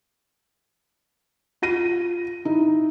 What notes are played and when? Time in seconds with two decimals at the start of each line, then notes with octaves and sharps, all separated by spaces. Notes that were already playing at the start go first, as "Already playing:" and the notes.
1.62 F4 A#6 D#7
2.45 D#4 E4